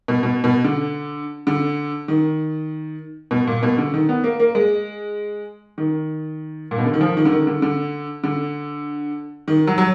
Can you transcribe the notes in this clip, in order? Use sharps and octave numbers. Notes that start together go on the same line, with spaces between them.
B2
B2
B2
D3
D3
D#3
B2
A#2
B2
D3
D#3
B3
A#3
A#3
G#3
D#3
A#2
B2
D3
D#3
F3
D#3
D3
D#3
D3
D3
D3
D#3
F#3
F#3